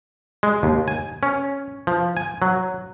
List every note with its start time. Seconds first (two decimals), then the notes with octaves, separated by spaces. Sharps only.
0.43 G#3
0.63 D#2
0.88 G#5
1.23 C#4
1.87 F3
2.17 G#5
2.42 F#3